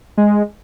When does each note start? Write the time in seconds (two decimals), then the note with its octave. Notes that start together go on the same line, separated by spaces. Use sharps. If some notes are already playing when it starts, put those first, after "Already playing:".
0.17 G#3